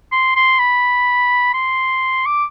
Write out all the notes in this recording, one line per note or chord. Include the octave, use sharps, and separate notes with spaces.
C6
C6
B5
C6
D6